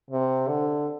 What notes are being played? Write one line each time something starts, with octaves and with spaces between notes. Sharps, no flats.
C3
D3